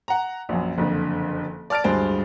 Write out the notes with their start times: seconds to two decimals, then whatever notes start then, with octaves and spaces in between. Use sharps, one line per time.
0.08 F#5 A#5
0.49 A#1 F#2
0.78 F#1 F2 D3
1.70 D5 A5 F6 A6 D7
1.84 D1 G2 G#3 G#4 C5 A6